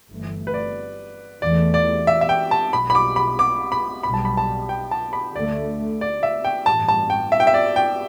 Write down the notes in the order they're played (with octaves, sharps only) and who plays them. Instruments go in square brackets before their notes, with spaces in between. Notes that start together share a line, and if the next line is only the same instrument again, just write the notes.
[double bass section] G1 G2 E3 A3
[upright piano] B4
D5
[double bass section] E2 E3 A3 [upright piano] D5
[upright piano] D5
E5
E5
G5
A5
[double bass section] B1 B2 G3 [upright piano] B5
[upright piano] B5
D6
B5
D6
B5
[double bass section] B1 B2 G3 [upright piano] B5
[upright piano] A5
B5
A5
G5
A5
B5
[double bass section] D2 D3 A3 [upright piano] D5
[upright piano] D5
E5
G5
[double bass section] A1 G2 G3 [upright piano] A5
[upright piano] A5
G5
E5
G5
E5
D5
G5